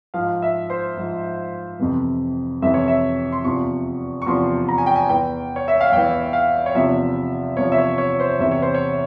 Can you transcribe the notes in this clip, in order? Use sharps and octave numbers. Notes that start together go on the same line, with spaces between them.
G#2 F3 F5
E5
C5
G#2 F3
F2 C3 E3
F2 C3 E3 E5
C#5
E5
C6
E2 C3 F3 C#6
C#6
E2 C3 F3 C6
A#5
G#5
G5
G#5
E2 E3 G5
C#5
E5
F5
E2 E3 G5
F5
C#5
E2 C3 F3 E5
E2 C3 F3 C#5
E5
C#5
C#5
C5
E2 C3 E3 E5
C#5
C5
C#5